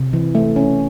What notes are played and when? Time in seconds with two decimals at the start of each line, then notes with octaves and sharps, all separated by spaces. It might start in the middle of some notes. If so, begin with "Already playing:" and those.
Already playing: C3
0.13 E3
0.35 A3
0.56 C#4